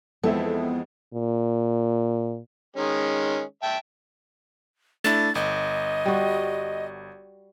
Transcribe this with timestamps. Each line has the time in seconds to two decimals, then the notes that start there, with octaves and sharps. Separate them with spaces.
0.23 F2 E3 G#3 B3 C4 A4 E5
1.14 A#2
2.76 D#3 G#3 C#4
3.63 E5 G5 A5
5.04 A3 D4 E4 A6
5.35 G1 D#5
6.06 G3 F#4